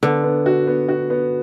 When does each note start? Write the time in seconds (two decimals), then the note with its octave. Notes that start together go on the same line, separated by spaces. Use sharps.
0.03 D3 B3
0.24 B3
0.46 F#4
0.67 B3
0.89 F#4
1.10 B3